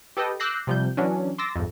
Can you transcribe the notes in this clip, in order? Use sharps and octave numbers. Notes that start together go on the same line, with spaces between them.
G4 A4 B4 D#5 G5
D6 E6 F#6 G6 A#6 C7
C3 F3 G3 G6
E3 F#3 C#4 D4
C6 D6 E6 A6 A#6
G#1 F2